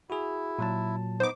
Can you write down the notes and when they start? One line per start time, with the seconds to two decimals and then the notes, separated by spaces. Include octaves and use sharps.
0.10 E4 F#4 G#4
0.59 A#2 F#3 A5
1.20 B3 D#4 C5 D6